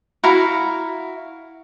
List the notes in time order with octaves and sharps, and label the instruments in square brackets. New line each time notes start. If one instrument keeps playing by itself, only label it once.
[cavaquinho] E4 F#4 F5 A#5